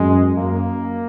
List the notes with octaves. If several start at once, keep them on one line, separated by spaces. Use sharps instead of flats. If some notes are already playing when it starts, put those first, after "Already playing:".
Already playing: F#2 G#3
F#2 A#3